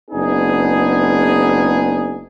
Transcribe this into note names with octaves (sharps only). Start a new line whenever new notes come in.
F#1 B3 D4 D#4 G#4